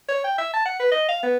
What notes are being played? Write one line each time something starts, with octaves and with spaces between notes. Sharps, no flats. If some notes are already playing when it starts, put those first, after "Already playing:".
C#5
G5
E5
A5
F#5
B4
D#5
F5
B3